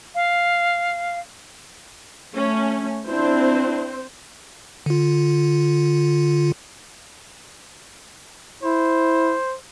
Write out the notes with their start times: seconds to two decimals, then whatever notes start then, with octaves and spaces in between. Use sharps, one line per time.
0.15 F5
2.36 A3 C#4
3.08 C4 D4 E4 C5
4.86 D3 F4
8.63 E4 C5